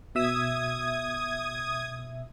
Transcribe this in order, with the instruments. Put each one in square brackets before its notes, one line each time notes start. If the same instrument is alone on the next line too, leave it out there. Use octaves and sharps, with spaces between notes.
[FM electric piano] B2 E5 E6 [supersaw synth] D#6 G#6